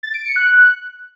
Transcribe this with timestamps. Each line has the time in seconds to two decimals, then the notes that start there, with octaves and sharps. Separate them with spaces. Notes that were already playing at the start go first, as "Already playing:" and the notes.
0.03 A6
0.14 D7
0.25 C#7
0.36 F#6